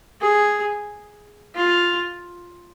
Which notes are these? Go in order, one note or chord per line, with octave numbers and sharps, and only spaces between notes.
G#4
F4